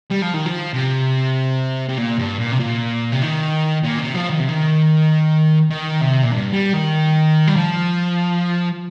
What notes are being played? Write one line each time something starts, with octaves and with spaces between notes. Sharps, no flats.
G3
F3
D#3
F3
C3
C3
A#2
G2
A#2
C3
A#2
C3
D#3
A#2
C3
F3
D#3
C3
D#3
D#3
C3
A#2
G2
G3
D#3
G3
F3